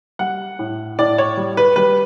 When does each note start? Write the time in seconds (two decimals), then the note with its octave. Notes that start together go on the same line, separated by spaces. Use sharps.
0.19 G3 F#5
0.59 A2
0.99 A2 D5
1.18 C#5
1.37 G3
1.57 B4
1.76 G3 B4